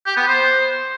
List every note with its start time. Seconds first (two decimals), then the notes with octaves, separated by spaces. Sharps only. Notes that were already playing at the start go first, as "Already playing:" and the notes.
0.06 G4
0.17 B3
0.28 C5